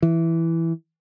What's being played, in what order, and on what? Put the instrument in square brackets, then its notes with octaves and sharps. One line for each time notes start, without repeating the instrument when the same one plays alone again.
[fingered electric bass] E3